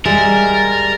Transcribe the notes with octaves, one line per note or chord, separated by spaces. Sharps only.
G3 G#3 A#4 E5 A6